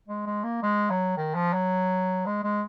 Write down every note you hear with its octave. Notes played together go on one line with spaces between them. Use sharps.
G#3
G#3
A#3
G#3
F#3
D#3
F3
F#3
G#3
G#3